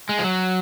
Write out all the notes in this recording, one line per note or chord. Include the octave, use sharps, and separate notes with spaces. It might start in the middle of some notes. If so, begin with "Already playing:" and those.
G#3
F3
F#3